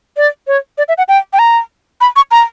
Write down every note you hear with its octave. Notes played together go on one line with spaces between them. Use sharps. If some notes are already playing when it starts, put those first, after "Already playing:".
D5
C#5
D5
E5
F#5
G5
G5
A#5
B5
C#6
A#5